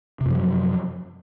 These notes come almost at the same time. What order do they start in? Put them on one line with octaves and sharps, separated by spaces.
C3 F#2 F3 F#3